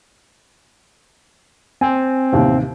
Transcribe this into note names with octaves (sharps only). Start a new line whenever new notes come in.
C4 G#5
A1 D#2 C3